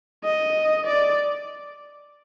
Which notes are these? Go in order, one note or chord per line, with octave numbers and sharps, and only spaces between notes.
D#5
D5